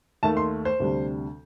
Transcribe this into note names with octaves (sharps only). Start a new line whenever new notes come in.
D#2 D#3 A3 A5
C6
C5
D2 C3 G3 D4